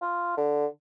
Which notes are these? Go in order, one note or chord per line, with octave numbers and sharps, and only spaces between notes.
F4
D3